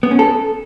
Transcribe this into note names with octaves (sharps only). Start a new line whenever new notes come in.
B3
C#4
A4